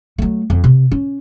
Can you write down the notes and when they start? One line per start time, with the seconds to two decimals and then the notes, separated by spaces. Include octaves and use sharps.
0.18 F#3 A3
0.50 F2
0.64 C3
0.92 C#4